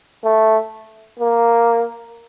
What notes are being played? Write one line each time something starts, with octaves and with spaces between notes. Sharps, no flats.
A3
A#3